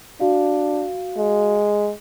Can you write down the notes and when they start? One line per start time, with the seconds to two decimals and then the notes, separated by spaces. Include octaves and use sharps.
0.20 D4 F#4 F5
1.17 G#3